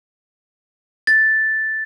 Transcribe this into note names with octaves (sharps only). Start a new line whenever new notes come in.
A6